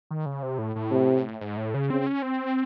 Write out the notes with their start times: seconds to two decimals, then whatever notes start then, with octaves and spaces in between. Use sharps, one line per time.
0.11 D#3
0.26 C#3
0.43 C3
0.59 A2
0.76 A2
0.91 C3
1.41 G#2
1.57 A2
1.74 C#3
1.90 C#3 C4
2.07 C#4
2.22 C4